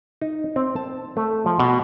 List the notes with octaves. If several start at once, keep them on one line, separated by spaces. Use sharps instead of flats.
D#4
C4
A5
A3
F3
B2